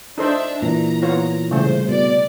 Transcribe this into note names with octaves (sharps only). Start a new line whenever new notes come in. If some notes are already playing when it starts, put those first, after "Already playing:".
D4 D#4 A4 C5 E5
A#2 E3 A#5
B3 F4 C#5
C2 C#3 A3 C5
B2 D5